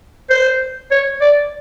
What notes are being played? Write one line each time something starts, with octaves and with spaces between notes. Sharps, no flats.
C5
C#5
D5